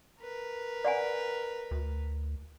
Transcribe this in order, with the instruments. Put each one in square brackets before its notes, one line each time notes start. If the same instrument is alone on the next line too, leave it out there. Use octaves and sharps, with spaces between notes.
[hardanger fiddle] A#4 B4
[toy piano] D5 F#5 G#5
[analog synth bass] D2